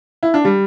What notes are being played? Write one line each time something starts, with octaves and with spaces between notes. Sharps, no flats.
E4
D4
G3